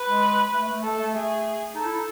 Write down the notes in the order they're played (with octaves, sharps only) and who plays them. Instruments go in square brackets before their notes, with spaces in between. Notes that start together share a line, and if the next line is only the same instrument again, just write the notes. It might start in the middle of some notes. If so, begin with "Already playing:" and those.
Already playing: [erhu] B4
[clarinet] G#3
A3
A3
[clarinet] A3 [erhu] A4
[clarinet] A3
[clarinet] A3 [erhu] G#4
[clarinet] D#4 [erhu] A4
[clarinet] E4
D#4